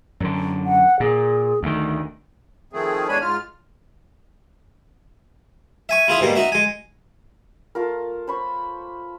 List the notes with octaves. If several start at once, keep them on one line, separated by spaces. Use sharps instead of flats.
F#2 D3
F#5
A#2 G#4
D2 D#3 A3
D#3 F3 A3 C4 G#4
E2 G#3 D4 C#5 G#5 B5
G#2 F4 F6
E5 G#5 C#6
E4 F4 G#4 E5
G#2 B2 G3 G#3 A#3
D#4 F#4 E5 F#5
G#3 G#5
A3 F4 A#4
C5 B5 C#6